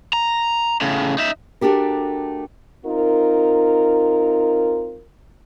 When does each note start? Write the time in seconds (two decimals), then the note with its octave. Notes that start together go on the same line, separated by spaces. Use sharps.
0.13 A#5
0.81 A2 C#3
1.18 D#4 E5
1.61 A3 D4 F#4 G4 A#4
2.85 C4 D#4 F4 A#4